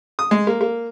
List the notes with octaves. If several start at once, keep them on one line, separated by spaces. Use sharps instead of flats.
D#6
G#3
A#3
A#3